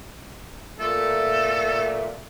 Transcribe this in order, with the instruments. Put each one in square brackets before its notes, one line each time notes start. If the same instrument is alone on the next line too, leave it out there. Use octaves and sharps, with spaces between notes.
[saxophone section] A#2 A3 [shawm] A4